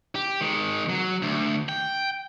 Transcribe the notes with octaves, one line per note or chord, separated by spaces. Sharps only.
G4
D#3 G#3
F#3
D2
G5